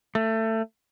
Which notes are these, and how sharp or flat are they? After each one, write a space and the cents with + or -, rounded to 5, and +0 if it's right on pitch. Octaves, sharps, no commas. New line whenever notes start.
A3 +20